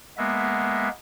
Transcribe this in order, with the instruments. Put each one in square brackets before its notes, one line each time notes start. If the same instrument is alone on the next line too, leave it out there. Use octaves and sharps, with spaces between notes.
[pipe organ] G#3 A#3 B3 E5